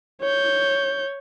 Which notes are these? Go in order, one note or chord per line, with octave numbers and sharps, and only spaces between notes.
C#5 G6